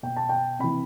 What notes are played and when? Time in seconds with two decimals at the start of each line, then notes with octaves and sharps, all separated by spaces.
0.03 B2 G5
0.16 A5
0.29 G5
0.59 C3 E3 B5